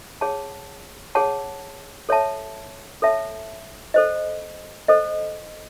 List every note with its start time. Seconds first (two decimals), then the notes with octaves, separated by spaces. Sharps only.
0.21 G#4 C#5 F#5 A5
1.15 G#4 C#5 F#5 A5
2.09 A4 C#5 E5 A5
3.02 A4 C#5 E5 A5
3.94 A4 C5 D#5
4.88 A4 C5 D#5